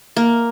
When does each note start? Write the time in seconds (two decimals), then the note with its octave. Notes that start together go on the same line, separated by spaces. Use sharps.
0.17 A#3